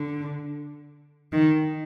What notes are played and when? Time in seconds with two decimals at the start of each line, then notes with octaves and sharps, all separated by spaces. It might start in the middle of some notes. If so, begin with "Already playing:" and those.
Already playing: D3
1.33 D#3